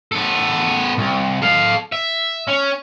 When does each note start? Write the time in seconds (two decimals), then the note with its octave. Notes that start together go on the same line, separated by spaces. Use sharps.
0.12 B3 A4
0.98 C2
1.42 A4 F5
1.92 E5
2.48 C#4